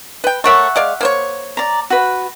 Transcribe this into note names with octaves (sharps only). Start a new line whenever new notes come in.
B4 G5
A3 A#4 C#5 E5 F#5 C#6
G#3 D5 F5
A#3 C5 C#5
D5 A#5
F#4 B4